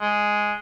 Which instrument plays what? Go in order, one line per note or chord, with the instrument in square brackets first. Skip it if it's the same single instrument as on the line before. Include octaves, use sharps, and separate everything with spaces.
[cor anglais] G#3